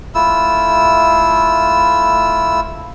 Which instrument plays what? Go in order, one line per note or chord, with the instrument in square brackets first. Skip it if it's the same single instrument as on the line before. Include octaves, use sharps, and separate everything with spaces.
[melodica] A3 E4 F4 E6